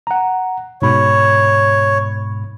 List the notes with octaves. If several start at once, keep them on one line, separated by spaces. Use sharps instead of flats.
F#5 A#5
G#2 B2 C#5 B5